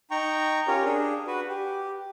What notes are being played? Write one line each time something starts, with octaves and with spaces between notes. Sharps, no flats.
D#4 G5 A#5 C#6
C#4 F4 G4 A#4 C#5
D4 G#4
F#4 B4
G4